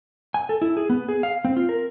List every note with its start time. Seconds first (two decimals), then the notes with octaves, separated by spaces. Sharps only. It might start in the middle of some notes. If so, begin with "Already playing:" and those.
0.34 G#5
0.49 A4
0.62 E4
0.77 G#4
0.90 B3
1.09 G#4
1.23 F5
1.45 C4
1.57 F4
1.69 A#4